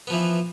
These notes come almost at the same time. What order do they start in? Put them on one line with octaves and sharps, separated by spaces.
B3 F3 E3